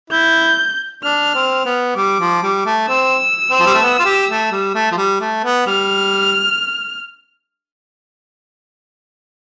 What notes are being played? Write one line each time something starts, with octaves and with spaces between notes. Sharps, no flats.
E4 G6
D4 F6
C4
B3
G3 D6
F3
G3
A3
C4 E6
C4
F3
G3
A3
B3
F4
G4
A3
G3
A3
F3
G3
A3
B3
G3 F6